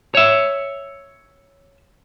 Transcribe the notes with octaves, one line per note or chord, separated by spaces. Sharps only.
C#5 E5